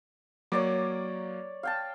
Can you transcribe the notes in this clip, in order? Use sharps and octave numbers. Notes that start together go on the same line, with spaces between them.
F#3 A#3 C#5 D5 D6
F5 G5 A5